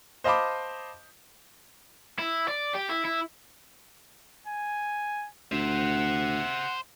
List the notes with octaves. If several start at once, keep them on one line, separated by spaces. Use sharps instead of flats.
C5 D#5 F5 A5 B5 D6
E4
D5
G4
E4
E4
G#5
D2 C5 E5 F#5